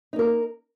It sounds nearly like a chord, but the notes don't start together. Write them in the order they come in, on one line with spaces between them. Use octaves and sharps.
D#4 A#3 A#4